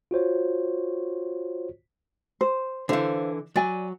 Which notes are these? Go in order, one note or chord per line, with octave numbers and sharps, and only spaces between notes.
F4 F#4 C5 C#5
C5
D3 E3 C5 F5
F#3 D5 G#5